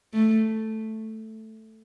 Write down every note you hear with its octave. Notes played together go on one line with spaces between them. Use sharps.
A3